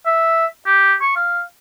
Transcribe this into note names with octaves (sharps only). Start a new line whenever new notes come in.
E5
G4
C#6
F5